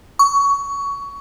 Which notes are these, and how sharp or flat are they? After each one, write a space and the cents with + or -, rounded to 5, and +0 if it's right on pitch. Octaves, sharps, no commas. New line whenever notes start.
C#6 +20